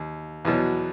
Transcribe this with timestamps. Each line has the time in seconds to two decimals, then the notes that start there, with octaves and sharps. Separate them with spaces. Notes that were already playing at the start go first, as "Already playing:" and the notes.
Already playing: D#2
0.45 E2 B2 F#3